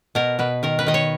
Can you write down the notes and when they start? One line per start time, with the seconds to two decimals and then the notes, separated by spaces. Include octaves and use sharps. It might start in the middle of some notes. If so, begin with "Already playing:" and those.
0.15 B2 A#4
0.39 B2 B4
0.63 D#3 A#4
0.79 B4
0.86 D#3 D#5
0.94 C#5